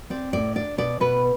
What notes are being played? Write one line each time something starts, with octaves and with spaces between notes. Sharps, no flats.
C4 D5
A2 D5
D4 D5
B2 D5
B2 B4